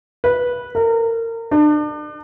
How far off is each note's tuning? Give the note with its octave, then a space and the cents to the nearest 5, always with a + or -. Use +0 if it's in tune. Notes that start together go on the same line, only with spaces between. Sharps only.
B4 -15
A#4 -30
D4 +35